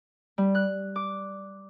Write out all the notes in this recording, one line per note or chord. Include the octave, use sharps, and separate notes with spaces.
G3
F#6
D6